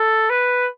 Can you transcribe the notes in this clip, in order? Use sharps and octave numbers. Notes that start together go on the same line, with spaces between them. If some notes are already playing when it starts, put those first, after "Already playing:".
Already playing: A4
B4